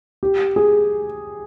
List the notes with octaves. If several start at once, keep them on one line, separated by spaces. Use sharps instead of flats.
G4
G#4